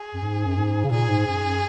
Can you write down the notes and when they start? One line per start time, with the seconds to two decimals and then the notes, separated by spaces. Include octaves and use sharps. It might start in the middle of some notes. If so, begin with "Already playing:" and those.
Already playing: G#4
0.14 F#2
0.22 G#2
0.46 F#2
0.57 G#2
0.84 C#3
0.91 A#2 G#4
1.09 G#2
1.26 F#2
1.43 F#2